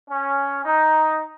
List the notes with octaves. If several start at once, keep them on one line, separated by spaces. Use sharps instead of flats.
C#4
D#4